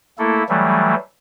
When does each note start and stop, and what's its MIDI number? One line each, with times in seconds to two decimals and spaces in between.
0.18 0.43 57
0.18 0.43 58
0.18 0.43 64
0.18 0.43 69
0.49 0.94 52
0.49 0.94 54
0.49 0.94 55
0.49 0.94 57